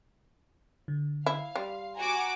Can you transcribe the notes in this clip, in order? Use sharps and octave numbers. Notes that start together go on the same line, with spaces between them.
D3
E4 F5
G3 C6
F#4 G#5 A#5 D6